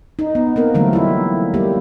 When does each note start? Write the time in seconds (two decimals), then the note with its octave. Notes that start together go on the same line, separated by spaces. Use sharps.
0.19 D#4
0.35 B3
0.56 A#3 C4 A#4
0.74 D3 E3 F#3 G3 A3 C4
0.93 E4 F4
1.54 G3 A#3 G4